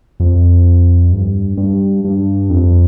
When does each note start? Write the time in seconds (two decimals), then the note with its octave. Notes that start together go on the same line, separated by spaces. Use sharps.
0.20 F2
1.12 G2
1.58 G2
2.05 G2
2.50 F2